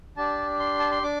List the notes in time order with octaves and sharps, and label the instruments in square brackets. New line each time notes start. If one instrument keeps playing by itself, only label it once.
[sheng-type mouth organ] D4 G4 A5
C6
A5
C6
D4 D6